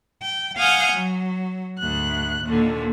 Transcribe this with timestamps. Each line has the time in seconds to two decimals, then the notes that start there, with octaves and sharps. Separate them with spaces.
0.23 G5
0.58 F5 F#5 G#5 D#6 F6 G6
0.92 F#3
1.78 D2 G#2 F#6
2.45 D#2 A#2 D3